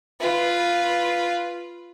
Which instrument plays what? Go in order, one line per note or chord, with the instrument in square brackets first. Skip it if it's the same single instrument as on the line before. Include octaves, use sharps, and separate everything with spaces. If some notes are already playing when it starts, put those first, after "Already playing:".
[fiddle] F4 B4